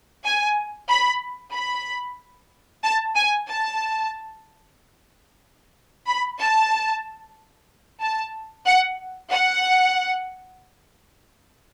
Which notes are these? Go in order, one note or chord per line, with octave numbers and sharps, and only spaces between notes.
G#5
B5
B5
A5
G#5
A5
B5
A5
A5
F#5
F#5